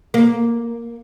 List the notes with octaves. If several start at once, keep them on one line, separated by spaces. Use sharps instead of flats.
A#3